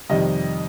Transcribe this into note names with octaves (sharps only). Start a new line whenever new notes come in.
F2 C3 D#3 G3 D#5